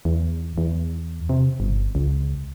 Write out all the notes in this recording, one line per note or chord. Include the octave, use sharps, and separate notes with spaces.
E2
E2
C3
G1
C#2